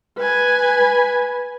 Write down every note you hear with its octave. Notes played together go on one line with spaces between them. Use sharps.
B4 G#5